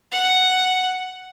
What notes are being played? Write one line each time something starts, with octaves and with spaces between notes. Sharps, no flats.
F#5